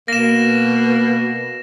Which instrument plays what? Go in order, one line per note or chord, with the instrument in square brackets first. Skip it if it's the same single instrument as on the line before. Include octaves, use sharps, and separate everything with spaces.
[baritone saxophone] B2 [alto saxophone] A#3 [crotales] A#6 E7